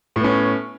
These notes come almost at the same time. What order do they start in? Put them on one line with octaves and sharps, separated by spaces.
A2 B3 C#4